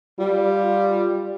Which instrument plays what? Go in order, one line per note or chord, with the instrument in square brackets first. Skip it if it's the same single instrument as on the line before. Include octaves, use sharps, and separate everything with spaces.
[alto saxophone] G3 [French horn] F4